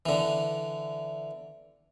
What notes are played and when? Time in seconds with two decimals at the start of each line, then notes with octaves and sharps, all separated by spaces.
0.06 D3 E3